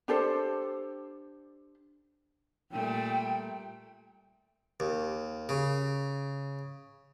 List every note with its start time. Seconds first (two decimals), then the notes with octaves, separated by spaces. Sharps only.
0.08 D4 G4 A4 C5
2.72 A#2 G3 A3 G5
4.80 D#2
5.49 C#3